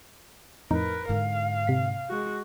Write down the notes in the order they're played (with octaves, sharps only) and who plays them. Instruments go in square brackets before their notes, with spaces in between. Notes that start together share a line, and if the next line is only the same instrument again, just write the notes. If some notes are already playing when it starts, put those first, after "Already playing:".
[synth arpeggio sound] F2 A2 D#4 [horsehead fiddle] A#4 B4
[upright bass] G#2 D3 [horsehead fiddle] F5
[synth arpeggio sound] C3 B6
[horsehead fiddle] G#3 F#4